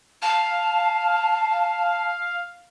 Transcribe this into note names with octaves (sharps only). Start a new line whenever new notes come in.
F5 A5